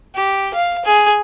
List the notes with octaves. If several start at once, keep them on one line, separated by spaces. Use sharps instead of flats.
G4
F5
G#4